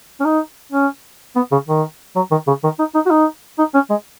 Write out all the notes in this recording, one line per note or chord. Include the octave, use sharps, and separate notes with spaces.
C#4
D#4
C#4
B3
C#3
D#3
F#3
D#3
C#3
D#3
D#4
D#4
F#4
D#4
D#4
C#4
G#3